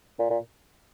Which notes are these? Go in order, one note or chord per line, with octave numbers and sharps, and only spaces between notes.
A#2
A#2